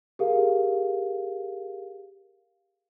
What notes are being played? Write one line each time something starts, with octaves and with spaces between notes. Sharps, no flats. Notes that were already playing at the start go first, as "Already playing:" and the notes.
G4 G#4 A#4 F5